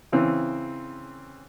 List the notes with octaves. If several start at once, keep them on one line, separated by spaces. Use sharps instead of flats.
C#3 E3 C4